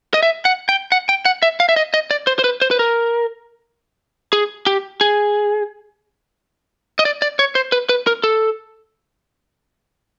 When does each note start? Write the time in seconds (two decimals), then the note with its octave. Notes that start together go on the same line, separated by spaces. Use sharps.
0.14 D#5
0.23 E5
0.45 F#5
0.69 G5
0.92 F#5
1.09 G5
1.25 F#5
1.43 E5
1.60 F5
1.69 E5
1.76 D#5
1.94 D#5
2.11 D5
2.27 C5
2.39 C5
2.44 B4
2.62 C5
2.71 B4
2.79 A#4
4.33 G#4
4.67 G4
5.01 G#4
6.99 D#5
7.05 D5
7.22 D5
7.39 C#5
7.55 C5
7.72 B4
7.89 B4
8.07 A#4
8.24 A4